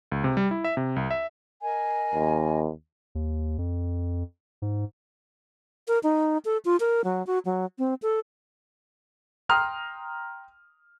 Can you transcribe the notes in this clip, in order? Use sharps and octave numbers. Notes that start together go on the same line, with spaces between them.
C#2
C3
G3
E4
E5
C3
C2
E5
A#4 D#5 G#5
D#2
D#2
F2
G#2
A#4
D#4
A4
F4
A#4
F#3
F#4
F#3
C4
A4
G5 A#5 C6 D#6 F6